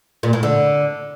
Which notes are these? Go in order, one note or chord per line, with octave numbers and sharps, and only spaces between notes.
A#2
A2
D3